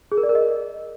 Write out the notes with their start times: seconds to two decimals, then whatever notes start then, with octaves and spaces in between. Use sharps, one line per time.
0.12 G#4
0.17 A#4
0.23 D5
0.29 A#4
0.35 D#5